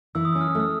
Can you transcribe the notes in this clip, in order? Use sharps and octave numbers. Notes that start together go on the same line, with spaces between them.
E3 E6
D#6
C#4 E6
F6
A3
E6